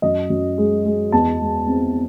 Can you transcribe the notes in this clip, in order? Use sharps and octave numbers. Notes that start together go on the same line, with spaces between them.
F#2 D#5
F#2
G#3
G#3
E2 A5
G#3
C4